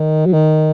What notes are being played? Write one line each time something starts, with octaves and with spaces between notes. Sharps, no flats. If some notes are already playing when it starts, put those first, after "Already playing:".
Already playing: D#3
F#3
D#3